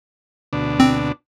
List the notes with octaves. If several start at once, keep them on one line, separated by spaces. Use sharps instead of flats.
D2 B2 D4
C4